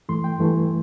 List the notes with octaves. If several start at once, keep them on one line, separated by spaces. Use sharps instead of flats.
G2 E3 A3 C6
G5
G2 E3 A3